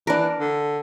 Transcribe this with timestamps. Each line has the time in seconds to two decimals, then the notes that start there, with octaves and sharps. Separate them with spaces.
0.07 E3 D4 A#4
0.40 D3